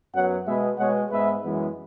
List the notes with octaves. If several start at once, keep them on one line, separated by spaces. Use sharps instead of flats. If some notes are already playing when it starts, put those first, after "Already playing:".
F#2 F#3 B3 C#5 F#5
B2 G#3 B3 B4 E5
B2 G#3 B3 C#5 F#5
G#2 G#3 B3 B4 E5
F#2 E3 G#3 B3